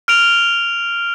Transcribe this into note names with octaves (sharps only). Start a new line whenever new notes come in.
F6 D7 F7